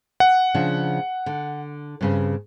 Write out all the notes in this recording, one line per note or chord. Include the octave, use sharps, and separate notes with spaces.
F#5
C#3 F3 D4
D3
G2 C#3 C4